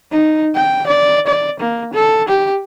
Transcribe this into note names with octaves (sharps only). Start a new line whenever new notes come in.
D#4
G5
D5
D5
A#3
A4
G4